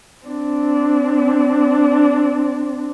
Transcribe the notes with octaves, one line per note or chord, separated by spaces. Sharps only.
C4 D4